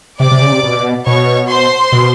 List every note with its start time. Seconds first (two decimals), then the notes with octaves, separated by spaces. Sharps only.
0.20 C3 D5 D6
0.31 C3
0.42 C#3
0.52 C3
0.63 B2
1.06 B2 C#5 C#6
1.49 C5 C6
1.92 B2